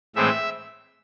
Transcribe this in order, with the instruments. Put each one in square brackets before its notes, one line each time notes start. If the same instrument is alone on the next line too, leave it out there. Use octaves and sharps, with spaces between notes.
[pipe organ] A2 E3 G#3 C4 E5